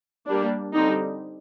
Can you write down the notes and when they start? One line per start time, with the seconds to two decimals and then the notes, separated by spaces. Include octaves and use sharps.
0.26 G3 A#3 D4
0.73 D3 G3 C4 D#4